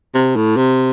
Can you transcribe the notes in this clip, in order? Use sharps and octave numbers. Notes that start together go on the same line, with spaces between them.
C3
A2
C3